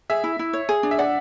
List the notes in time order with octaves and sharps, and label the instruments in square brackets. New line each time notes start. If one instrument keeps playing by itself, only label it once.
[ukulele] G#4 [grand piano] E5
[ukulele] E4
E4
C#5
G#4
D4
[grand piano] E5
[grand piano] D5 [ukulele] F#5